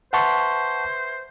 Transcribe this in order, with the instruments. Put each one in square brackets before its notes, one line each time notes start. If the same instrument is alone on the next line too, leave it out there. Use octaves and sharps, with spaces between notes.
[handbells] B4 E5 C6 [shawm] C5 [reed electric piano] F#5 A5 C#6